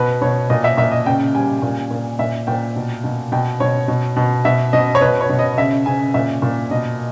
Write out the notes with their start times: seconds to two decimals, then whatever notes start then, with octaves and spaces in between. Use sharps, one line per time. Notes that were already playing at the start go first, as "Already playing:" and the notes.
Already playing: B2 B4
0.22 B2 C#5
0.50 A#2 D#5
0.64 E5
0.77 A#2 E5
0.92 D#5
1.06 C#3 G5
1.35 G3 G#5
1.62 A#2
1.91 A#2
2.19 A#2 E5
2.47 A#2 G5
2.76 B2
3.04 B2
3.32 B2 G5
3.60 B2 C#5
3.88 B2
4.16 B2
4.45 B2 E5
4.73 B2 D#5
4.95 C#5
5.01 B2 B4
5.21 C#5
5.29 B2
5.39 D#5
5.57 C#3 E5
5.86 C#3 G#5
6.14 A#2 E5
6.42 A#2
6.71 B2 D#5